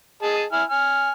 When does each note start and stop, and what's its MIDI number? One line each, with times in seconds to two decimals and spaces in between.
0.23 0.44 68
0.23 0.44 75
0.23 0.44 81
0.52 0.63 64
0.52 0.63 80
0.52 0.63 89
0.70 1.12 80
0.70 1.12 89